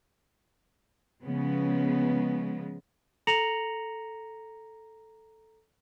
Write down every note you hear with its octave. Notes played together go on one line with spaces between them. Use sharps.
C#3 F3 G#3 B3
A4 A#5 A#6 C#7 F7 F#7